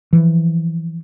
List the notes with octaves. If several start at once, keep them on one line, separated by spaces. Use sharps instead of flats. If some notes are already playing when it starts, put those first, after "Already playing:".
E3 F3